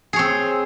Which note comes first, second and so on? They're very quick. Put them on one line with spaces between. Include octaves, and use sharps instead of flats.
G#4 C#5 C4